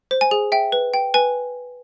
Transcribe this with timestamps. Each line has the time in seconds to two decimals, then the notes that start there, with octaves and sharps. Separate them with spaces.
0.11 C5
0.21 G#5
0.31 G#4
0.52 E5 G5
0.72 B4
0.94 G5
1.14 B4 G#5